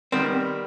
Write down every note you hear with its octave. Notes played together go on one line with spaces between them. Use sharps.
D#3 G3 B3 C4